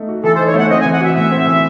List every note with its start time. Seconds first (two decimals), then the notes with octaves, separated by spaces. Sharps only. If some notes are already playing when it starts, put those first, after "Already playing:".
Already playing: A3 D#4
0.09 F#4
0.24 E3 A4
0.35 C5
0.39 D#4
0.47 C#5
0.54 A3 F#5
0.70 C4 D#5
0.81 G#5
0.85 E3
0.93 F#5
1.00 F#4 E5
1.16 A2 E5
1.31 C4
1.47 E3